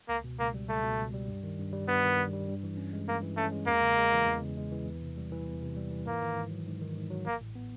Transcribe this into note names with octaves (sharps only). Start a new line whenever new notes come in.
C#2 A#3
B2
C#2 A#3
G3
C#2 A3
B2
C#2
G3
G2
D#3
G2
G3
G2 B3
D#3
G2
G3
G2
E3
C#4
G#3
G2 A#3
E3
A3 C#4
G#3
E2 A#3
C#3
G#3
E3
E2
C#3
G#3
E3
E2
C3
G3
E3
E2
C3
G3
E3
G#2 A#3
D#3
G#2
F#3
G#2
D#3
G#2
F#3
A1 A#3
A2
B3